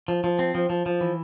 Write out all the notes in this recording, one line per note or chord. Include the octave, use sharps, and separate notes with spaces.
F3
F3
C4
F3
F3
F3
E3